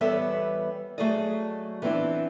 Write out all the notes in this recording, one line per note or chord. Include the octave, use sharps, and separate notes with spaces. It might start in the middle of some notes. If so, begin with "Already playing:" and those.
E2 G3 B3 A4 C#5 E5
F#3 A3 G#4 A4 D5 D#5
E3 B3 C4 D4 E4